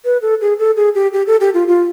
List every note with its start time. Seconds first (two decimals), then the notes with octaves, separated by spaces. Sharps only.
0.05 B4
0.22 A4
0.41 G#4
0.59 A4
0.76 G#4
0.95 G4
1.13 G4
1.27 A4
1.40 G4
1.54 F4
1.68 F4